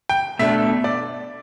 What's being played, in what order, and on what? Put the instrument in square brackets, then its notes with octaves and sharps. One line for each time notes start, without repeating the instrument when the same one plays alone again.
[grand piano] G5
[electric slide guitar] B2 A3 D4 [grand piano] E5
[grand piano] D5